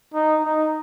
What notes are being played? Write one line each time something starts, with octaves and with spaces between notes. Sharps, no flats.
D#4
D#4